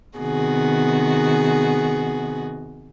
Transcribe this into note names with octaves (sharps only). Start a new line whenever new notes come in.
C3 D#3 B3 F#4 G#4